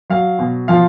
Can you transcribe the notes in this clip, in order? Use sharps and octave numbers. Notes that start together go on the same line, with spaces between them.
F#3 F5
B2
F3 F5